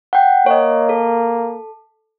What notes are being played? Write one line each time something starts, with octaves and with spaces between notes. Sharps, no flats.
F#5 G5
A#3 C#5 D#5
A4